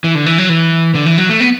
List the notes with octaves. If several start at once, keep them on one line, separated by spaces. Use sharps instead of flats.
E3
D3
E3
F#3
E3
D3
E3
F#3
A3
B3